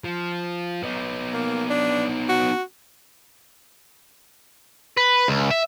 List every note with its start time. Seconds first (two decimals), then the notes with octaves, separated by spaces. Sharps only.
0.04 F3
0.83 B3 D#4
1.33 A#3
1.70 D4
2.29 F#4
4.97 B4
5.28 C#2
5.51 E5